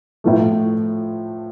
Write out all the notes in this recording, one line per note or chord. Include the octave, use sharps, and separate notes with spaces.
A2 F3 A3